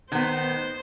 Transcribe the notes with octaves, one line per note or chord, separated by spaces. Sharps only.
D#3 B3 C5